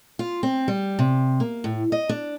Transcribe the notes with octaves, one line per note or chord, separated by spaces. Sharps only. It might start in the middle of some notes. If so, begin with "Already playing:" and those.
F4
C4
G3
C3
A#3
A2
D#5
D4